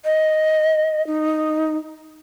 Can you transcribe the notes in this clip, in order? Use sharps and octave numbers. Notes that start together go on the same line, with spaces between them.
D#5
D#4